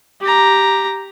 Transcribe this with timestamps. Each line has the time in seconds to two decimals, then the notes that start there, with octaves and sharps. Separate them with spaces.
0.21 G4 A#5